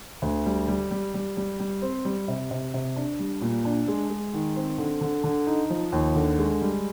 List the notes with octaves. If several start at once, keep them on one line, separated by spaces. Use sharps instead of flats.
D2
G3
G3
G3
G3
G3
G3
C4
G3
C3
C3
C3
D4
G3
A#2
D4
G#3
G#3
D#3
C4
D3
D3
D3
D#4
F3
D#2
D3
G#3
G3